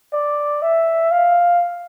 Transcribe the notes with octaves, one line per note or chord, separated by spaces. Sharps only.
D5
E5
F5